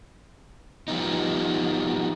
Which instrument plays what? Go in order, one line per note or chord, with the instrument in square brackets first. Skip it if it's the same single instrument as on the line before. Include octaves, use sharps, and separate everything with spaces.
[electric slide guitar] F3 G3 B3 D#4